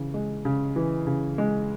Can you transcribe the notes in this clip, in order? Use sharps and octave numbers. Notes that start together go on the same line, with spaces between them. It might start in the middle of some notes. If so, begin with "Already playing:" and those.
Already playing: C#3 E3
G#3
C#3
E3
C#3
G#3